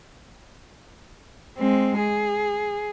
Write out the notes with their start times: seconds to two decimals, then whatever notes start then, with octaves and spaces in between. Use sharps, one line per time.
1.58 G#3 C4
1.99 G#4